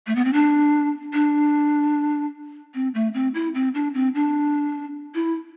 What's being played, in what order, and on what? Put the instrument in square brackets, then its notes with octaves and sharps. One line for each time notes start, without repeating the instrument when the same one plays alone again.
[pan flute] A3
B3
C4
D4
D4
C4
A3
C4
E4
C4
D4
C4
D4
E4